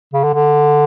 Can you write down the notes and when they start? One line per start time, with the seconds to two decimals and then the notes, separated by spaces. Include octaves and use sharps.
0.13 C#3
0.24 D3
0.34 D3